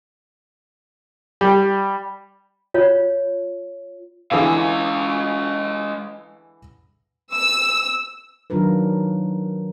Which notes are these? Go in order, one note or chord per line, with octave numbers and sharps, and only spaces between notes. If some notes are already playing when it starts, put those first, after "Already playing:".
G3
F4 C#5
D3 E3 G#3 G#4 F5
E6
D#3 F#3 D4 F4 A#4 B4